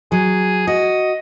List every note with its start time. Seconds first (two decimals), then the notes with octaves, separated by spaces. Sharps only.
0.12 F#3 G#4
0.67 F#4 D#5